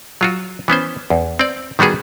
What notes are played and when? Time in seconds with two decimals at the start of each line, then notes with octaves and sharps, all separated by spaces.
0.21 F#3 F4 F#4
0.68 E3 B3 C#4 C5
1.10 E2
1.39 C4 D5
1.79 D#3 G3 B3 F#4 G#4